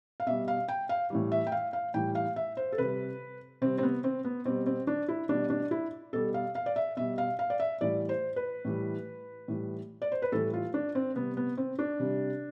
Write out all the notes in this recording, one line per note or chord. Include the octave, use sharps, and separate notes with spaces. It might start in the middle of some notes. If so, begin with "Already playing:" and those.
F5
B2 G3 E5
F5
G5
F5
A2 E3 G3
E5
G5
F5
F5
A2 E3 G3 G5
F5
E5
C5
A4
C3 G3 B4
C3 G3 C4
C4
B3
C4
B3
B2 G3 C4
C4
D4
E4
B2 G3 D4
D4
E4
B2 G3 A4
F5
F5
D5
E5
B2 G3 E5
F5
F5
D5
E5
A2 E3 G3 D5
C5
B4
A2 E3 G3
A2 E3 G3
D5
C5
B4
A2 E3 G3 A4
F4
D4
C4
C3 G3 B3
B3
C4
D4
C3 G3